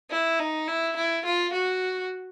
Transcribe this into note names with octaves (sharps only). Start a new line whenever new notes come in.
E4
D#4
E4
E4
F4
F#4